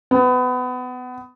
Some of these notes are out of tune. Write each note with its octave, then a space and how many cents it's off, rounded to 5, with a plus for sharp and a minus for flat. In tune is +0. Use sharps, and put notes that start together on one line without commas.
B3 +25